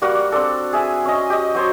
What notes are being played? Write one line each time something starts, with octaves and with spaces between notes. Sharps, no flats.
G3 A#3 F#4 F#5
C4 D4 A4
G#4 E5 G#5
C#4 D#5
G4 D#5
F#3 C5 C#5